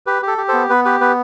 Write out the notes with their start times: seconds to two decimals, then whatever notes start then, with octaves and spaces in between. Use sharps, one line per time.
0.07 G4 B4
0.22 G4
0.27 A4
0.38 G4
0.48 B3 A4 C5
0.69 B3 B4
0.85 G4 B4
1.01 B3 B4